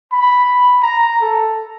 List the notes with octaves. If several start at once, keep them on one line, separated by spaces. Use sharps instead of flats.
B5
A#5
A4